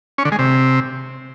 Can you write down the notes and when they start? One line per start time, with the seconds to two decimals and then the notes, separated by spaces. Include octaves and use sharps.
0.18 C#4
0.25 D3
0.32 G#3
0.39 C3